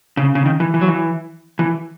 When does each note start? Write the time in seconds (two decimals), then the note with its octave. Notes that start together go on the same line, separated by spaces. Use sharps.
0.17 C#3
0.35 C#3
0.46 D#3
0.60 E3
0.74 E3
0.81 F#3
0.88 E3
1.59 E3